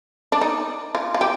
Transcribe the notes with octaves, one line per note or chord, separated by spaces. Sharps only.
D4
D#4
F4
F4
G4